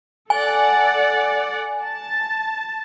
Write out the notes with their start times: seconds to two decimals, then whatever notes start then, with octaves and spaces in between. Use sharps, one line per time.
0.30 A4 D5 F#5 G#5
1.84 A5